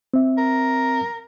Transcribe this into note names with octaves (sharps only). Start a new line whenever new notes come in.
C4 E5
A#4